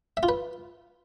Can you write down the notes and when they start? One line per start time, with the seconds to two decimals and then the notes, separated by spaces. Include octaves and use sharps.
0.17 E5
0.23 F4
0.29 B4